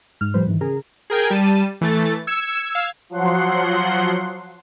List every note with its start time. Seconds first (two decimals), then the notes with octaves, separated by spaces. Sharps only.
0.21 G#2 F6
0.34 A2 F3 G3 B4 C5
0.47 G#2 D#3 E3
0.61 C#3 G#4 A#4
1.10 G#4 A#4 G5 G#6
1.30 G3 A5 D#7
1.81 E3 A3 A6
2.27 E6 G#6 C#7 E7
2.75 F5 E6 G#6
3.09 F3 F#3 F#5 C6